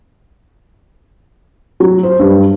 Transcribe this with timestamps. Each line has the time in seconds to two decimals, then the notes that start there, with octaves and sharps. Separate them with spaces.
1.80 F#3
2.03 C5
2.19 G2